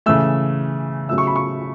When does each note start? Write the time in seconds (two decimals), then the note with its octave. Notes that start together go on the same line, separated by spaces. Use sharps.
0.06 C#3 E3 A3 E6
1.09 C#3 F#3 A3 E6
1.18 C#6
1.27 B5
1.36 C#6